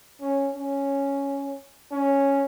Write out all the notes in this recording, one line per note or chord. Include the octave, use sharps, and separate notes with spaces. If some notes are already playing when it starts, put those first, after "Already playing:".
C#4
C#4
C#4